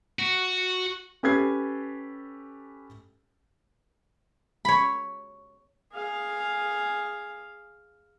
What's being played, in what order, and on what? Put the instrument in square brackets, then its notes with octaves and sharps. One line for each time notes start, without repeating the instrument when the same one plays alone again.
[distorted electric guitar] F#4
[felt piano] C#4 G4 A4 B4 G#6 C7
[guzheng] C#5 B5
[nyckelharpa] G#4 F5